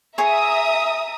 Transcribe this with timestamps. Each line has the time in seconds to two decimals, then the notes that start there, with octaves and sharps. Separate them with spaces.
0.18 G#4 C#5 E5 A#5 D#6